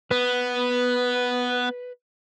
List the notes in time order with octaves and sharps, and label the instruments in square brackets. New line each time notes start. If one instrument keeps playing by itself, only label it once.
[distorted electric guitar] B3 [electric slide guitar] B4